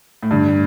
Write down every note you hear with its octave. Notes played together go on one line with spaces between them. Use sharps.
A2
G2 D3